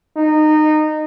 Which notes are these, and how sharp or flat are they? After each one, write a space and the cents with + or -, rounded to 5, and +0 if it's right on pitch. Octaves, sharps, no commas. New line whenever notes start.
D#4 -20